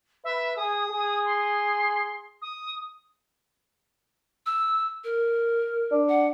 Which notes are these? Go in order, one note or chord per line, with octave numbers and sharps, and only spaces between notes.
B4 E5
G#4 D#6
G#4
C6
D#6
E6
A#4
D4
F#5